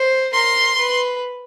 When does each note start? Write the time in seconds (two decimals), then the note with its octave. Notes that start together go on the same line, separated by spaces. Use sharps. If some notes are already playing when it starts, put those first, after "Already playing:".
Already playing: C5
0.33 A#4 C6
0.78 B4